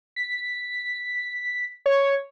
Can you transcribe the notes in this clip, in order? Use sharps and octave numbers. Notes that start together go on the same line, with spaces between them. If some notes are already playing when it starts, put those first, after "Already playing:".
B6
C#5